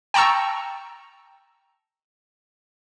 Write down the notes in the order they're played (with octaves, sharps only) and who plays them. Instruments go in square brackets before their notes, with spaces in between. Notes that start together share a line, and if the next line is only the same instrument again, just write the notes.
[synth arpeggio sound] G5 A5 A#5 C#6 E6